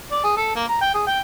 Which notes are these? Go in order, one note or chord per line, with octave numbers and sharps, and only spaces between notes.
D5
G#4
A4
A#3
A#5
G5
G#4
G5